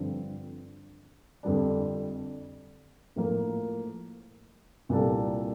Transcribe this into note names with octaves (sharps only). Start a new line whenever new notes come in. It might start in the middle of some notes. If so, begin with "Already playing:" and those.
Already playing: G2 D3 F3 C4
F2 D3 G3 D4
A2 F3 A#3 F4
C2 A#2 G3 D4 A4